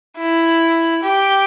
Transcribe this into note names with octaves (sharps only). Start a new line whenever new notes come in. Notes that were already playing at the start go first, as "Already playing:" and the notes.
E4
G4